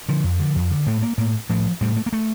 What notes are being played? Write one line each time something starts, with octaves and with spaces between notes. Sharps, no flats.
D3 F3
F2
D3
F2
D3
A2 A3
A#3
A2 A#3
A2 F3
A2 G3
A3
A#3
A3